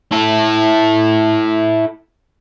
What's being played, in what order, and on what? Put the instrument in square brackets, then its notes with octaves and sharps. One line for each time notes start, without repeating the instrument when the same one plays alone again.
[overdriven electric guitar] E4 A4